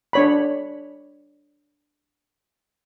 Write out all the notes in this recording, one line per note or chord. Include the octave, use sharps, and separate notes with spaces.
D4 C#5 B5